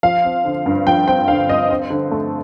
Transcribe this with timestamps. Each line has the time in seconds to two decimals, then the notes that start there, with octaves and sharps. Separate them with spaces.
0.03 F3 F5
0.24 C4
0.45 D3
0.66 G2
0.87 F3 G5
1.07 C4 G5
1.28 D3 F5
1.49 G2 D#5
1.70 C4
1.90 D3
2.11 A3